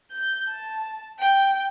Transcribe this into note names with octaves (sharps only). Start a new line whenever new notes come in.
G6
A5
G5